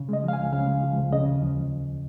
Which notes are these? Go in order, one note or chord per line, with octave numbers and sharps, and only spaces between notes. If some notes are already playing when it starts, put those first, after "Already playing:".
Already playing: C#3
G#3 D#5
F3 F5
G#5
C#2
C#3 F5
G#3
F3
C#2
C#3 D#5
D#2
F3